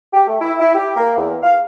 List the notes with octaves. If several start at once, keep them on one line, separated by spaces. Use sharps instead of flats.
G4
A3
E4
E4
G4
A#3
E2
F5